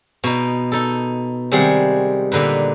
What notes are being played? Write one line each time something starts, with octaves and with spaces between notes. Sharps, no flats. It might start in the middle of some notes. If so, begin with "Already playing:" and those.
B2 D#4
D#4 A4
C3 D#3 G3 G#3 G#4 F#5
A#2 D3 D#4 B4